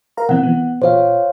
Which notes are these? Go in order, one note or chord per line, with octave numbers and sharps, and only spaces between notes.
A#4 F5 A#5
B2 E3 C4 F#5
E3 B3
A#2 F4 C5 C#5 F5